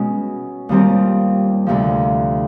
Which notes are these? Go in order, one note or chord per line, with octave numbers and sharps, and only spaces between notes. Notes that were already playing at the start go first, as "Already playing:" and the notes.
Already playing: B2 G#3 C#4
D#2 D#3 G3 C4 F4
D2 C3 F3